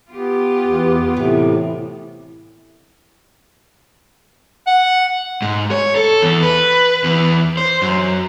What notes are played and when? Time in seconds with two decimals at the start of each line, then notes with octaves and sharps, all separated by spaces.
0.11 B3 F4 G4
0.66 E2
1.17 A2 C3 E3
4.67 F#5
5.42 G#2
5.71 C#5
5.96 A4
6.22 E2
6.43 B4
7.04 E2
7.57 C5
7.82 F#2